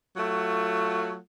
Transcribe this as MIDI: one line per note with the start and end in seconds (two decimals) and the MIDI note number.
0.17 1.17 54
0.17 1.17 57
0.17 1.17 65
0.17 1.17 78